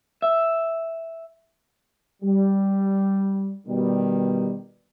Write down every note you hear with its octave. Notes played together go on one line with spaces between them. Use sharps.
E5
G3
B2 D#3 G3